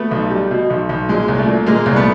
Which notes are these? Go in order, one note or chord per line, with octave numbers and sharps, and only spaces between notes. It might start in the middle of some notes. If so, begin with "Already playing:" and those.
Already playing: A3 B3
B1
G3
B2
B1
B1
A#2 G#3
C2
A3
A#2
A#2 G#3 A#3
C2
A3 B3